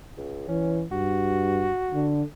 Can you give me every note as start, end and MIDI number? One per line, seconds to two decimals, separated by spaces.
0.17 0.48 37
0.48 0.85 52
0.48 0.81 61
0.92 1.71 43
0.92 2.14 66
1.93 2.23 50